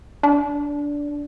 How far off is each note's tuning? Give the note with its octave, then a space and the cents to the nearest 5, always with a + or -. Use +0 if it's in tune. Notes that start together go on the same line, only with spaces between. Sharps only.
D4 -15